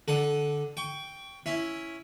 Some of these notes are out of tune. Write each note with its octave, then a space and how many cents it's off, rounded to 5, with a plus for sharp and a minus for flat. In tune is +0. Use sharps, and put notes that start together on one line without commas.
D3 +0 A4 -15 F#5 +0
G5 +0 C#6 +25
C#4 +0 E4 +0 E5 +0